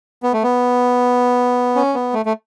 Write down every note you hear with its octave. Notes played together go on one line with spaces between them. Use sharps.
B3
A3
B3
C#4
B3
A3
A3